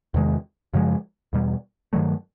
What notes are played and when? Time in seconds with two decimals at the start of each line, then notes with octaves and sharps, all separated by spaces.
0.14 E2 C3 D#3 G#3
0.74 F#2 C#3 F3 G#3
1.33 E2 B2 G3
1.93 G2 D#3 F#3 A3